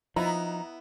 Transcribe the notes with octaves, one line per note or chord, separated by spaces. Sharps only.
F3 B3 D#4 E4 A#5